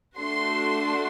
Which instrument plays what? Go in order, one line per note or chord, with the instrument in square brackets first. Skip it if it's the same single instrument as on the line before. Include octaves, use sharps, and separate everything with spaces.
[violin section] A3 D4 F#4 A4 C6